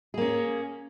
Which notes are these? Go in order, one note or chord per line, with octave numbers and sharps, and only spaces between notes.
A#3 C#4 G#4